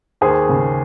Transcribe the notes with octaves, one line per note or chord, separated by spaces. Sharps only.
D#2 G#4 C5
C#3